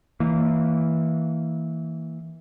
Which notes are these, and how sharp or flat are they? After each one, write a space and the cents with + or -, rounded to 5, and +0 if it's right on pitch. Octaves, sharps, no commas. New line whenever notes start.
E3 -20 A#3 -20